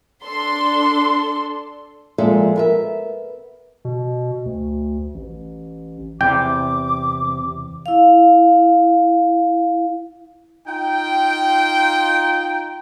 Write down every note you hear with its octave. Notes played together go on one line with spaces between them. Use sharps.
D4 A4 C6
A#2 F3 G#3 A4 E5
B3 A#4 E5
B2
D2
A1
E2 C3 G5 D6
E4 F5
D#4 F4 G5